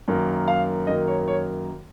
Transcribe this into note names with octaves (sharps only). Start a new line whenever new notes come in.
F#2 D#3 A#3
F5
F#2 D#3 A#3 D#5
C#5
C#5